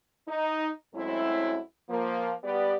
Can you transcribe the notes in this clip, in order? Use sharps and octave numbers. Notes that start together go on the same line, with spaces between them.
D#4
F#2 F#3 G#3 A3 C4 E4
F3 A#3
G3 B3 G4 D5